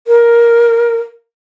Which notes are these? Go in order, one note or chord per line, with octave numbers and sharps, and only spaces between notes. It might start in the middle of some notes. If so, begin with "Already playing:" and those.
A#4